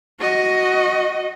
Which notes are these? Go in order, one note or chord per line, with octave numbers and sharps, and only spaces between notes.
F#4 D#5